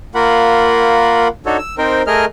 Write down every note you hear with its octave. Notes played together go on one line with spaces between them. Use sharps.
A#3 F4 A#4 F#5 B5
D4 D#4 F#4 A4 C#5
E6
C4 D#4 A#4 C5 G5
A3 G#4 A#4 D#5 F6